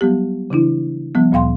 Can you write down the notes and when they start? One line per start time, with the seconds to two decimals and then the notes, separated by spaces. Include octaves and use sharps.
0.01 F#3 G3 B3 G4
0.50 C#3 E3 D4 E4
1.15 F3 G3 B3
1.32 D2 A#2 F5 G5 C6